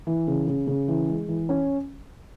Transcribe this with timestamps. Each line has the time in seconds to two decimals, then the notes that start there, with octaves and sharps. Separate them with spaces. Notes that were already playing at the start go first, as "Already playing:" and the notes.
0.07 E3
0.28 C#3
0.47 C#3
0.67 C#3
0.88 E3
1.08 G#3
1.28 E3
1.49 C#4